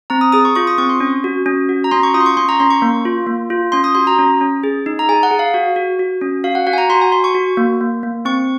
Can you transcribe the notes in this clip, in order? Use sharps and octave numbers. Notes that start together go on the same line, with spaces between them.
C4 A#5
D#6
G#4 D#6
C#6
F4 C#6
D#6
C4 C#6
C6
C#4
F#4
C#4
F#4
A#5
C#4 C6
C#6
F4 D#6
C6
C#6
C#4 C6
A#5
C#4 C6
C#6
A#3
F4
A#3
F4
C#4 C6
D#6
F#4 C6
A#5
C#4
C#4
G#4
D#4
A#5
G#4 G#5
F#5
G#4
F5
F#4
F#4
F#4
C#4
F#4 F5
F#5
F#4 F#5
G#5
A#5
F#4 C6
G#5
F#4 C6
C#6
F#4
A#3
A#3
A#3
C4 C#6